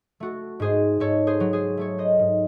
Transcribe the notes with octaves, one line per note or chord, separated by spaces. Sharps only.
A3 F#4 A4
G#2 G#4 C5
G#2 A4 C#5
G#4 C5
F#3
G#4 C5
A3 A4 C#5
C5 D#5
G#2